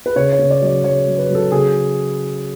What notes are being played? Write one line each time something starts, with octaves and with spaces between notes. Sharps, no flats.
B4
C#3 C#5
C#5
C#3
D5
F#3
D5
F#3 C#5
F#3
B4
F#3
A4
C#3 G#4